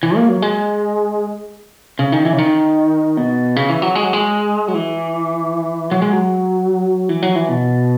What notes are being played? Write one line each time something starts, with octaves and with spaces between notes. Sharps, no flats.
E3
A#3
F#3
G#3
C#3
D#3
E3
C#3
D#3
B2
C#3
E3
F#3
G#3
F#3
G#3
F#3
E3
F#3
G#3
F#3
E3
F#3
E3
B2